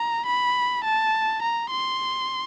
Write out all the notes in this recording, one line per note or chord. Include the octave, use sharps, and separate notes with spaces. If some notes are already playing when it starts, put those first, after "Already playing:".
Already playing: A#5
B5
A5
A#5
C6